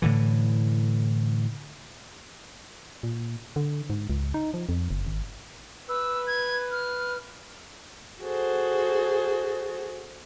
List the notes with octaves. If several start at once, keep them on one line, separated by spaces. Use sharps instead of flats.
A2 D3 E3
A#2
D3
G#2
C#2
D#4
F3
F2
F#1
G#1
B4 E6
G#6
F6
F#4 G#4 A4 C5